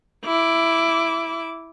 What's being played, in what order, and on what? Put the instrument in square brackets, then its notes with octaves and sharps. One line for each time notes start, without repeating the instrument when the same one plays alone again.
[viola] E4 D6